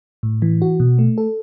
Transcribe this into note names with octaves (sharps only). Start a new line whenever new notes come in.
A2
E3
F#4
B2
A3
A4